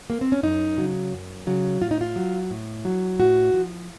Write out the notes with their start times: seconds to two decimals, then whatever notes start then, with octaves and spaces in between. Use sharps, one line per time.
0.10 A#3
0.21 C4
0.32 C#4
0.43 F#2 D#4
0.78 C#3 F#3
1.13 F#2
1.47 C#3 F#3
1.82 A2 F4
1.91 D#4
2.01 F4
2.16 F#3
2.51 A2
2.85 F#3
3.19 A2 F#4
3.54 F3